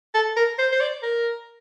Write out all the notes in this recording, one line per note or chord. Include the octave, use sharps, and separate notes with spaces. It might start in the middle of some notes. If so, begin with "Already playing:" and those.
A4
A#4
C5
C5
D5
A#4